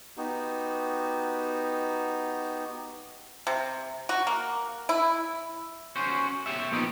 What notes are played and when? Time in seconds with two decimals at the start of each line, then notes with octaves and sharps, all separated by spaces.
0.17 B3 D#4 F#4 G4
3.47 C3
4.09 F#4
4.27 A#3
4.89 E4
5.96 C#4 F#4 C5
6.46 G4 C#5 E5
6.72 A#2 F3 B3 D#4 G4